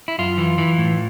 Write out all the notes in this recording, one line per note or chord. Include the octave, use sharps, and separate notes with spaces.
E4
F#2 F4
E3
E3
A2